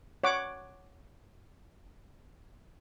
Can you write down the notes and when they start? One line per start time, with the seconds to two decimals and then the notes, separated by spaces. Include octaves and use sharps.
0.23 C#5 F#5 D6